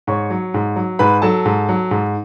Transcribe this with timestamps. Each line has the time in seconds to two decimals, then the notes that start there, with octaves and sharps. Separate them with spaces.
0.07 G#2 C#5 C#6
0.30 F#3
0.54 G#2
0.76 F#3
0.99 G#2 B4 B5
1.22 F#3 A4 A5
1.45 G#2
1.69 F#3
1.91 G#2